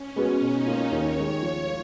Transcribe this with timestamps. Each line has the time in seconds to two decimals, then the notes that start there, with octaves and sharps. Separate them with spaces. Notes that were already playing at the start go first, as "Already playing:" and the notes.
Already playing: C#4
0.16 G#3 B3 F#4 B4
0.42 B2 D#4
0.66 A#3 F4
0.91 D#2 C#5
1.17 D#3 G#3
1.43 F3
1.67 F4